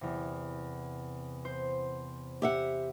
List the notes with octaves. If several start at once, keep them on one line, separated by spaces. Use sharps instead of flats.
E2 C3
C5
G4 E5 F#5